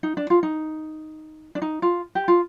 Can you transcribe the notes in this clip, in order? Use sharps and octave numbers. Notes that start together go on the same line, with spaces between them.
D#4
D4
F4
D#4
D4
D#4
F4
G4
F4